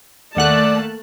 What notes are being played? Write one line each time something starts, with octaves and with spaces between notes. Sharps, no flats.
D#2 A3 A#3 D5 F#5 A5 F#6